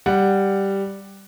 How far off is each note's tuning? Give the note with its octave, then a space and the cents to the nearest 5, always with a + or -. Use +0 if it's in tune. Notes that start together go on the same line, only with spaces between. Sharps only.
G3 +0 F#5 +0